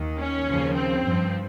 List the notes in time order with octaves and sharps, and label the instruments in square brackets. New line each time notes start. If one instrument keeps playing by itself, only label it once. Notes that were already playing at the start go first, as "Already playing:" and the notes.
Already playing: [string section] D#2 D#3
C#4
D#2 C#3 F3
C4
G2 F3